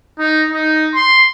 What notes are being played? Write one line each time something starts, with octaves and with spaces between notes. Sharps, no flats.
D#4
D#4
C6